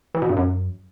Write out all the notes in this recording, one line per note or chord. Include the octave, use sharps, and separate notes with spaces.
E3
B2
G2
F#2